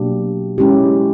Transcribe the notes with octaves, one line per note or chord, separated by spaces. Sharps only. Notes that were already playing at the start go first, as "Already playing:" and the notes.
Already playing: B2 F#3 A#3 D4 G4
G#3 C#4 E4 G4